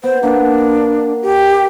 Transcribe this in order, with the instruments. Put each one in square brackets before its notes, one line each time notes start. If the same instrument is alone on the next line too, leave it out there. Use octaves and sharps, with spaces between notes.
[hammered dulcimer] B3 [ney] C5
[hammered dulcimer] A#3 F#5 [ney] D4
[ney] G4